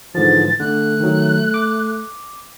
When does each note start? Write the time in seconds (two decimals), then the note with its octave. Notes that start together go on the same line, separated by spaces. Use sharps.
0.15 G#2 D3 E3 F3 A6
0.60 D3 A3 F#6
1.00 D#3 F#3
1.54 D6